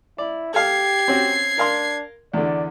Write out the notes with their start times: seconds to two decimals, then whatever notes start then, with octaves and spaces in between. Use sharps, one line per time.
0.18 E4 D5
0.54 G4 A4 F5 G#6 C7
1.08 C4 C#4 F#4
1.58 D4 A#4 F5 C6
2.34 E2 D3 D5